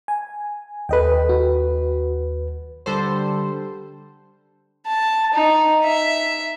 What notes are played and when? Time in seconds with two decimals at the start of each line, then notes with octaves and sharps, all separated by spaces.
0.08 G#5
0.89 D#2 A4 B4 D#5 G5
1.29 F#4
2.86 D3 G3 A4 C5
4.86 A5
5.34 D#4
5.84 E5